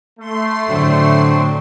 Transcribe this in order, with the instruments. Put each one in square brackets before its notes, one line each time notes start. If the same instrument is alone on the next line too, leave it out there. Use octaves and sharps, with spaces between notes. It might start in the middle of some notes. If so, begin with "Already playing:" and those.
[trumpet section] A3 [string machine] C6
[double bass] A2 D3 [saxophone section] F#3 C4 D4